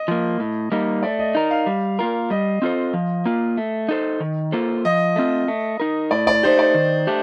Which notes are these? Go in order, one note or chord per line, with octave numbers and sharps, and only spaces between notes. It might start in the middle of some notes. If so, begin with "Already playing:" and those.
Already playing: D#5
F3 A#3
A2
G3 A#3 D#4
A3 D5
D#5
D#4 A#4
F5
G3
A#3 F4 A#4
G3 D#5
C4 F4 A4 C5
F3
A#3 F4
A3
D#4 A4 C5
D#3
A#3 F4 A4 C5
F3 D#5
A3 C4 F4
A3
D#4 A#4
A2 D5
D5
A3 D#4 G4 C5
D5
D#3
A3 D4 G4